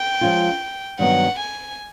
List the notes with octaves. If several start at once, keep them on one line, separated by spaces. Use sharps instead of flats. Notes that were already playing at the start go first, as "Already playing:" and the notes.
Already playing: G5
F3 G#3 C#4 F4
G2 D#3 F#3 B3 D#4 F#5
G#5